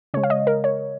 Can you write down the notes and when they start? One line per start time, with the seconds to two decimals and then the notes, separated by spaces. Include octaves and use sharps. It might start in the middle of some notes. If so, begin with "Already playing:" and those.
0.14 C#3 G#3 C#5
0.23 F5
0.30 D#5
0.47 A#4
0.64 C#5